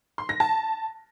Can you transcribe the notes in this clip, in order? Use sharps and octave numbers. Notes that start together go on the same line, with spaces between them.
C6
A#6
A5